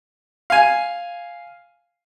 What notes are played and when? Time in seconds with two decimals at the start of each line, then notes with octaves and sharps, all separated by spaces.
0.50 F5 G#5